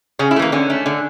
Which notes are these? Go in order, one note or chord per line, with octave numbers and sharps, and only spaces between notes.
C#3 C#4
E4
A3
E3 A#3
D3 C#4
A3
D3